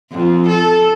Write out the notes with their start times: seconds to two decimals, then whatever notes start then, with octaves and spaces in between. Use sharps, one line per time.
0.11 F2
0.48 A4